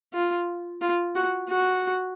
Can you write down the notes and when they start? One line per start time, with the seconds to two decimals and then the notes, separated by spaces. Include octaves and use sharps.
0.14 F4
0.81 F4
1.15 F#4
1.49 F#4